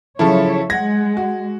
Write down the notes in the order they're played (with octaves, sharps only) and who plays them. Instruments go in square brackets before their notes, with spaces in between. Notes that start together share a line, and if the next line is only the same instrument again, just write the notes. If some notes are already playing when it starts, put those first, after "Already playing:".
[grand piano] C#3 F3 A4 [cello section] F#3 C#5 E5 [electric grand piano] E4 A5
[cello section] G#3 [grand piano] F#5 A#6 [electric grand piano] G#6
[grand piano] F#4